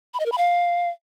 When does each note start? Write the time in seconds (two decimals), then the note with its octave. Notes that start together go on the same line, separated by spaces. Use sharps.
0.14 B5
0.20 D#5
0.26 A#4
0.32 B5
0.38 F5